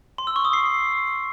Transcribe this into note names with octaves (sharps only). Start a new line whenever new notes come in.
C6
E6
C#6
D#6
C7